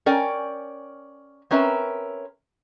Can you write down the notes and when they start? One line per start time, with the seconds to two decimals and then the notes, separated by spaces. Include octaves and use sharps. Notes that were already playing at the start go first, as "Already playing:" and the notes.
0.06 C#4 A#4 D5 G5 G#5
1.51 C4 C#4 A#4 B4 E5